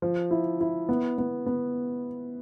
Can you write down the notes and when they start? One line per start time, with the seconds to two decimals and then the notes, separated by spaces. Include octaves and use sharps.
0.02 F3
0.31 E4
0.61 E4
0.89 B3
1.18 B3
1.46 B3